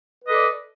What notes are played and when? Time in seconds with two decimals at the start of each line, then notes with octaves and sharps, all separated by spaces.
0.23 B4
0.27 D#5
0.31 A4
0.34 D5